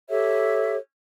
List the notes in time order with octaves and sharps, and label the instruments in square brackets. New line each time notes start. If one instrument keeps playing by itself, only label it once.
[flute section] G4 A4 C#5 E5